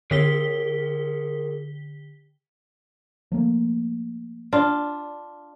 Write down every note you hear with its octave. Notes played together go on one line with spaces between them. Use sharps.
D3 F4 G#4 A#4 B6 G7
F3 A3 A#3
D4 F4